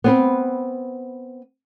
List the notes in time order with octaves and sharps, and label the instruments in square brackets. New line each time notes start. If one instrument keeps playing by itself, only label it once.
[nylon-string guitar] B3 C4 B4